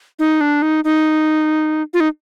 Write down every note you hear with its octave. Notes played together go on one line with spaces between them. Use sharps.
D#4
D4
D#4
D#4
F4
D#4